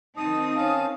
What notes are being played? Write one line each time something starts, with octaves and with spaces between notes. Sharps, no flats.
D#3 C4 D#4 A5 D#6
C#4 F5 A5